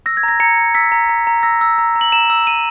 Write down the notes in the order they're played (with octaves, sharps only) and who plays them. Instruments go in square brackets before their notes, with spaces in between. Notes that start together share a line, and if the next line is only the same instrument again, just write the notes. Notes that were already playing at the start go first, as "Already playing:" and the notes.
[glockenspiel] E6 A#6
G#6
A#5 A#6
A#5 C#7
A#5
E6 B6
A#5
A#5
A#5
E6 A#6
E6
A#5
A#5
F#7
A#5 E7
E6
E6 D#7